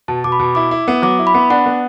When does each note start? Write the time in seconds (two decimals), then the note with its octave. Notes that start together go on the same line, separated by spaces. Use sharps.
0.08 B2 A5
0.24 B2 D6
0.32 B5
0.39 B2
0.55 E4 D6
0.71 E4
0.88 B3
1.02 F#3 D6
1.19 E4
1.27 B5
1.34 B3
1.50 D4 F#5
1.66 B3